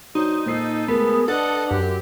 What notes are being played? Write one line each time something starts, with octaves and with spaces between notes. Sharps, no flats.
F#3 D4 D#4 C5
A#2 A4 C5 C7
D2 G#3 B3 G#4 A#4
D4 A4 B4 D#5 F#5 A6
F#2 G4 D6